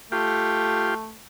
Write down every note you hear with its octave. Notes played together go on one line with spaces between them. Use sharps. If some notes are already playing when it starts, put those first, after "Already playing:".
A3 F4 G4